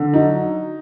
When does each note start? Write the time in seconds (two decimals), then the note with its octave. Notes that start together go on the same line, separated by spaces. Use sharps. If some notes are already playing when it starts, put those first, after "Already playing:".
Already playing: D3
0.13 F#3 D#4